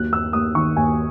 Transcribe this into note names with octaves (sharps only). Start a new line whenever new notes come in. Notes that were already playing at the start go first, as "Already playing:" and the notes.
Already playing: D#2 F#3 F#6
D#2 E6
D#2 D#6
D#3 C#6
D#2 G#5